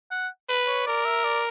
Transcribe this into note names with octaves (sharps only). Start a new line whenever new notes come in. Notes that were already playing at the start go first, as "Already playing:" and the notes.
F#5
B4
C#5
A#4 D5
E5
D5